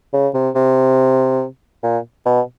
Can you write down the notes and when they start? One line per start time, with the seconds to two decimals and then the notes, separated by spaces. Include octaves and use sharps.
0.13 C#3
0.34 C3
0.55 C3
1.83 A#2
2.26 B2